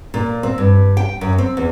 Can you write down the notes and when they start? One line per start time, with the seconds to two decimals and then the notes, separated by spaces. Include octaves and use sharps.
0.14 A#2
0.43 C4
0.58 G2
0.97 G5
1.21 F#2
1.38 C4
1.57 E2